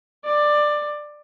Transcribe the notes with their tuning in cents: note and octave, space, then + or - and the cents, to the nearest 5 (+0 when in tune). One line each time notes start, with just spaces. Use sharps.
D5 +15